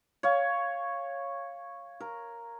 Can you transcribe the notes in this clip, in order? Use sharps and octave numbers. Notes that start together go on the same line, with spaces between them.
C#5 F5
A#4